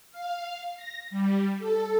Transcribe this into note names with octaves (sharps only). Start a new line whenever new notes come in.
F5
A#6
G3
A4